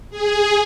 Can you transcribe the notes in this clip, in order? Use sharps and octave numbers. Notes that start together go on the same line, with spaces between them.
G#4